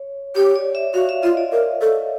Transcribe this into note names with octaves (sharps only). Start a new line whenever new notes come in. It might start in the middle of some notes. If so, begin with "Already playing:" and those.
Already playing: C#5
G4 C#5
D5
E5
F#4 F5
E5
F4 D#5
D5
A#4
A4